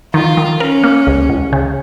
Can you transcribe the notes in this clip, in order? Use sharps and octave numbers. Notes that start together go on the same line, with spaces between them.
D#3 F4
D#3
C#4 A#4
A#3
C#2
C#2
C#3